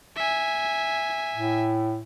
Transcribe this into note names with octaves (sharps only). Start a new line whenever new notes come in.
E5 G#5
A2